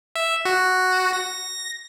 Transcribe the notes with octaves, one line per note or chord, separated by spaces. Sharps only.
E5
F#4
A#6